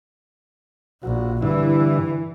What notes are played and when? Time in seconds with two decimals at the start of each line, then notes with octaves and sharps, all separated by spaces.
1.03 A#1 F#4
1.42 G2 D3 E3 E4